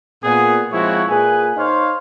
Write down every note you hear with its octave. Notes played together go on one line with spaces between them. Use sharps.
A#2 B3 G#4
F3 G#3 C4 E4 F#4 C#5
A#2 G#4 B4 G#5
D#4 C5 C#5 F5